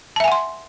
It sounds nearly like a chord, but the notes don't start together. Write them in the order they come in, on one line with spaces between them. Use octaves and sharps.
A5 E5 G#5 F#5 C6